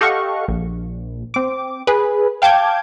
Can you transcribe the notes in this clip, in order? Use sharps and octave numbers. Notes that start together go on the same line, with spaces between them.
G4 A4 D#5 F5 F#5 C#6
A#1
C4 D6
G#4 B4
F5 G5 A5 D6 G6 G#6